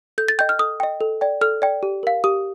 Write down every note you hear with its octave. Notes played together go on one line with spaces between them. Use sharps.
A4 G6
A6
D#5 G5 G6
F6
A4 D#6
D#5 G5
A4
D5 G5
A4 F6
D5 G5
G4
A#4 F5
G4 D#6